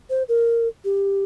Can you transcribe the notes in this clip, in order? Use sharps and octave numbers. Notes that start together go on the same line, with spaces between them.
C5
A#4
G4